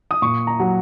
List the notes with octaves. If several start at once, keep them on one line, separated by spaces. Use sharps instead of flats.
D#6
A#2 C#6
A#5
F#3